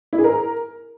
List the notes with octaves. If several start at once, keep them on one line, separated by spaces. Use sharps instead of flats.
E4
G#4
A#4